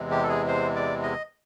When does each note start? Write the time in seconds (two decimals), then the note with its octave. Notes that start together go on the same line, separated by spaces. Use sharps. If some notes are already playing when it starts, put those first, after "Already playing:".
Already playing: E2 C3 E3 G#3
0.11 G4
0.23 A4
0.29 G#4
0.48 C5
0.76 D5
1.03 D#5